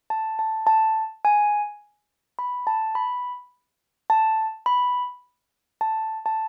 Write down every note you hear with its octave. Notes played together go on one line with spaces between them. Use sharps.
A5
A5
A5
G#5
B5
A5
B5
A5
B5
A5
A5